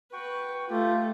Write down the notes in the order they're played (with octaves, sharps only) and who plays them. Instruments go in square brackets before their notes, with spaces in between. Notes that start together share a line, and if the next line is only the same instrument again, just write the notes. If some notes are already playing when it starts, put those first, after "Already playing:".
[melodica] F#4 G5 C#6 [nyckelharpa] B4
[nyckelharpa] A3 [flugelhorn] F4 [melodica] G4